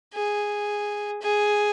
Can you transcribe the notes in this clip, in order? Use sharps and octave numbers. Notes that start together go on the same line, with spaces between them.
G#4
G#4